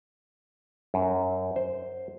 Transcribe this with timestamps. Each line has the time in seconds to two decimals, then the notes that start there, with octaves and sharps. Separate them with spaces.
0.94 F#2
1.56 C5